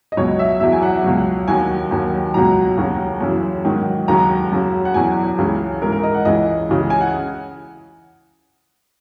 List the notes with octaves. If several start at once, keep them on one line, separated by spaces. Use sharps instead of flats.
D#5
C#2 B2 F#3 C#5
E5
E2 B2 F#3 E5
G#5
F#5
C#2 B2 F#3
D#2 D#3 F#3 G#5
D#2 D#3 F#3
C#2 B2 F#3 A#5
D#2 C#3 F#3
F#2 C#3 E3
G#2 D#3 F#3
D#2 C#3 F#3 A#5
F#2 C#3 F#3
F#5
E2 B2 F#3 G#5
C#2 C#3 E3
G#2 E3 A#4
A#4
D#5
F#5
C#2 C#3 E3 D#5
C#2 C#3 E3
G#5
F#5